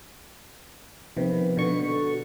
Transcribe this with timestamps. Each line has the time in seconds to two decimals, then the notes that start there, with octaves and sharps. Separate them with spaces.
1.17 C3 D#3 F3 B3 B4
1.57 B2 D3 C#6
1.88 F#4 A4